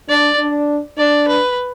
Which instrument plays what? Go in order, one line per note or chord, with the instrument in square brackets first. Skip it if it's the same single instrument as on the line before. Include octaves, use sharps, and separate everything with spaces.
[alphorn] D4 [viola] D5
[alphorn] D4
[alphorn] D4 [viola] D5
[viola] B4